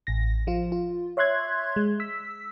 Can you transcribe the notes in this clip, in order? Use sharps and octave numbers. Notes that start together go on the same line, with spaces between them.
A1 A#6
F3 F4
F4
C#5 E5 C6 F#6 G#6
G#3
E6 B6